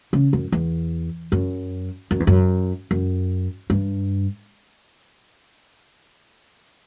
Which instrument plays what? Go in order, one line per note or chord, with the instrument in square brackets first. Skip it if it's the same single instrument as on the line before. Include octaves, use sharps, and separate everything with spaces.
[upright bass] C#3
F#2
E2
F#2
F#2
E2
F#2
F#2
G2